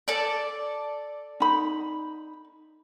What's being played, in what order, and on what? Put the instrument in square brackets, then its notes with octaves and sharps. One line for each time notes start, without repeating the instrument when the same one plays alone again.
[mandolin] A4 D5
[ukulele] D#4 B5